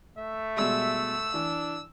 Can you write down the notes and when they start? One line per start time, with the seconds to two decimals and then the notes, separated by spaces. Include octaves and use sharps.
0.18 A3 E5
0.57 B2 G3 G#3 E6
1.34 E3 D4